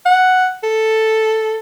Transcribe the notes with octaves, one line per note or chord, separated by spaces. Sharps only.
F#5
A4